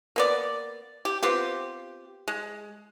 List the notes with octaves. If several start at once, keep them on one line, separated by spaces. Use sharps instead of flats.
A#3 B3 D5
G4
B3 C4 F4 G4
G#3